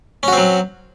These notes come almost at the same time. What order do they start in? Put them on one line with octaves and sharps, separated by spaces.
C#4 F#4 C4 F#3